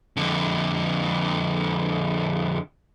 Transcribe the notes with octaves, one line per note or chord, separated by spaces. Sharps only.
F2 D3